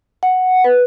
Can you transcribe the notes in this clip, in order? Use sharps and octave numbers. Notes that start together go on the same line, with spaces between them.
F#5
B4